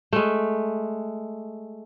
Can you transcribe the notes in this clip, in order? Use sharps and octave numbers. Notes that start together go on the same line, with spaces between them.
G#3 A3